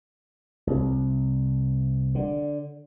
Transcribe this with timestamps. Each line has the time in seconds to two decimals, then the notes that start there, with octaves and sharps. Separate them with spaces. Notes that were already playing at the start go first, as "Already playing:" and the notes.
0.67 C2
2.15 D3